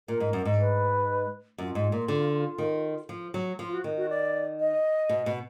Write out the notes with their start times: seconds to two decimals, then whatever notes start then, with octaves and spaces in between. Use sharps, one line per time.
0.08 A#2 A#4
0.20 G#2
0.33 F#2
0.45 G#2
0.58 B4
1.58 F#2 F4
1.75 G#2
1.92 A#2
2.08 D3
2.58 D#3
3.09 F3
3.34 F#3
3.59 F3 F4
3.72 F#4
3.84 D#3
3.97 F#4
4.09 D5
4.59 D#5
5.09 B2
5.26 B2